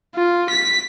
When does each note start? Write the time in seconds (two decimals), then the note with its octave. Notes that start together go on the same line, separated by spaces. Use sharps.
0.15 F4
0.50 B6